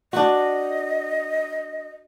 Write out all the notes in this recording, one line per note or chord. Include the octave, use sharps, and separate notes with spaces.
D4 F#4 D#5